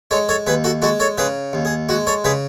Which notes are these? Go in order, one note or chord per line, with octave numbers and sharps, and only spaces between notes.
G#3 A4 C#5
A4 C#5
D#2 G#4 B4
F#4 A4
G#3 F#4 A4
A4 C#5
C#3 G#4 B4
D#2
G#4
G#3 F#4
A4 C#5
C#3 G#4 B4